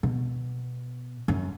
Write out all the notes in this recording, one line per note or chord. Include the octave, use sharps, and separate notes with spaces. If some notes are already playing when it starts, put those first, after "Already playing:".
B2
F#2